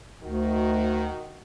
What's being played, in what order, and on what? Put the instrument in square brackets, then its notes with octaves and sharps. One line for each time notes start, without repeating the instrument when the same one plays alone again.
[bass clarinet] D2 [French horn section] D#3 F#4